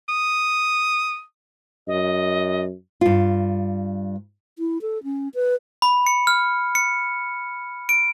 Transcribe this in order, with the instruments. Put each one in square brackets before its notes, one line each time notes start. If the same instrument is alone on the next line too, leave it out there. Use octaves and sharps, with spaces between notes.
[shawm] D#6
[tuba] F#2 [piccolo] D#5
[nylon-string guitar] G2 F4
[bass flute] E4
A4
C#4
B4
[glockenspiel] B5
C#7
F6
C#7
D7